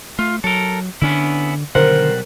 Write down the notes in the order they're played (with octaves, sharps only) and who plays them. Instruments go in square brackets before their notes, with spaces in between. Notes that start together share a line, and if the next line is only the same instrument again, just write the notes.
[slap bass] A3 [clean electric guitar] F4
[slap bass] F#3 [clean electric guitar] A4 A#4
[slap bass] D3 D4 [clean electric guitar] B3 C#4 E4
[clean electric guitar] B1 G3 F#5 [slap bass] D3 D#3 [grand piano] A#4 C5